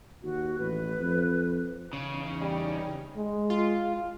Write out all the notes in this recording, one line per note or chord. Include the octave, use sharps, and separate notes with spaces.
D#2 F#4
A1 B4
F2
E2 C#3 C#4 D#4
G3
G#3
F4